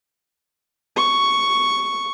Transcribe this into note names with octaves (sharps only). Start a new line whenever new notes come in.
C#6